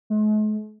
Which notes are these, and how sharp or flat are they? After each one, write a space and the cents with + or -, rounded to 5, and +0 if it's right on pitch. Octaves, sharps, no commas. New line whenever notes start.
G#3 +45